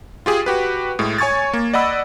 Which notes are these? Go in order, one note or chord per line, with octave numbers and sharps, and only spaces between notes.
F4 G4 G#4
F#4 G4 B4
A2 G#3
C#5 G#5 C#6 G#6 A6
A#3
D5 D#5 F#5 B5 E6